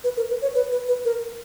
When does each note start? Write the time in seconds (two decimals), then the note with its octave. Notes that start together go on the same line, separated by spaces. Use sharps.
0.04 B4
0.17 A#4
0.30 B4
0.42 C#5
0.55 B4
0.72 B4
0.88 B4
1.05 A#4